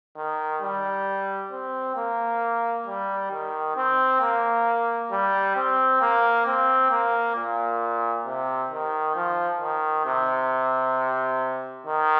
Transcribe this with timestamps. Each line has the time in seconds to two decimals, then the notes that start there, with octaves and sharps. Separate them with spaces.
0.16 D#3
0.62 G3
1.52 C4
1.96 A#3
2.87 G3
3.32 D#3
3.76 C4
4.21 A#3
5.11 G3
5.56 C4
6.01 A#3
6.46 C4
6.91 A#3
7.36 A#2
8.25 C3
8.71 D#3
9.16 F3
9.60 D#3
10.06 C3
11.86 D#3